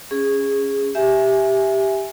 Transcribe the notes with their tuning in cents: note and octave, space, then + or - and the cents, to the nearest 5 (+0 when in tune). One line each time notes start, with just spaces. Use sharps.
C#4 +0 G#4 -15
G4 +0 E5 +0 G#5 +0